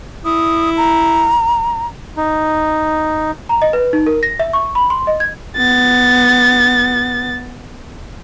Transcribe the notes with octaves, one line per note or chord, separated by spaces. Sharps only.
E4 D#6
A#5
D#4
A#5
D#5
B4
D#4
A#4
A#6
E5
C#6
B5
C6
D#5
G#6
B3 A6